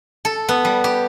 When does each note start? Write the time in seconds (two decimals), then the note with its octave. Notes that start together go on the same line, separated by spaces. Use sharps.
0.25 A4
0.49 B3
0.65 G3
0.84 G4